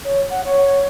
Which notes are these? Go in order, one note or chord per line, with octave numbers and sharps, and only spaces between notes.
C#5
F#5
C#5